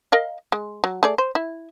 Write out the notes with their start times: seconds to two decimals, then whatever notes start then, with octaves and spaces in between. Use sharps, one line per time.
0.12 A#4 D#5 F5
0.52 G#3
0.84 F#3
1.03 A3 G#4 D5
1.18 C5
1.35 E4